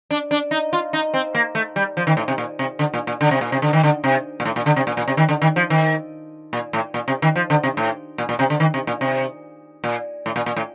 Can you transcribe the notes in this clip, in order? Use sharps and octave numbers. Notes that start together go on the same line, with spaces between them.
D4
D4
D#4
F4
D#4
C4
A#3
A3
G3
F3
D#3
A2
C3
A#2
C3
D3
A#2
A#2
D3
C3
A#2
C3
D3
D#3
D3
C3
A#2
A2
A#2
D3
C3
A#2
A#2
C3
D#3
D3
D#3
F3
D#3
A#2
A2
A#2
C3
D#3
F3
D3
C3
A2
A#2
A#2
C3
D3
D#3
C3
A#2
C3
A#2
A2
A#2
A#2
A2